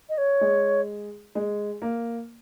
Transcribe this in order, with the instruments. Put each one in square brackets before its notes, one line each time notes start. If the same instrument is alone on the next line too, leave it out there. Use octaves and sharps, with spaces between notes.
[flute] D#5
C#5
[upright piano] G#3
G#3
A#3